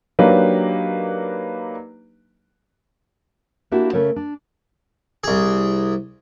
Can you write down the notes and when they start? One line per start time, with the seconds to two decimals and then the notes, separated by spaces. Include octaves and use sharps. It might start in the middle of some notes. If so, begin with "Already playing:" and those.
0.19 F#3 A#3 D4 D#4 G4 B4
3.71 A#3 D4 E4 F#4 G4
3.93 C#3 A3 A#4 C#5
4.16 D4
5.24 C2 G#4